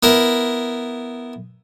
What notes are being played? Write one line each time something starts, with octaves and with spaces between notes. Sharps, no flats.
B3 E4 A#4